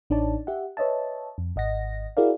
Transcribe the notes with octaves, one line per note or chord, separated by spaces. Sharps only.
A1 D4 D#4 C#5 D5 A5
G4 E5 F#5
B4 C#5 D#5 E5 A5
F2
G#1 D#5 F#5 A#6
E4 F#4 G#4 A#4 D5 F5